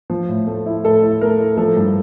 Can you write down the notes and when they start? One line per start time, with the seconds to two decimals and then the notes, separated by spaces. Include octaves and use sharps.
0.10 F3
0.29 A2
0.47 A3
0.66 E4
0.84 A2 A4
1.02 E4
1.21 A3 A#4
1.39 E4
1.57 F3 A4
1.77 G2